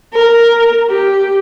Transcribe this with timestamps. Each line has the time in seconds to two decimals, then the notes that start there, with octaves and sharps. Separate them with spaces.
0.13 A#4
0.89 G4